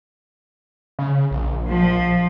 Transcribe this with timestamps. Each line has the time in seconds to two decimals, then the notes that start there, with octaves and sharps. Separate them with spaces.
0.99 C#3
1.31 A#1
1.69 F3